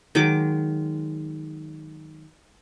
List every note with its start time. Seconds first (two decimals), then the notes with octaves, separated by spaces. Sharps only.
0.15 D#3 F#3 G#3 D6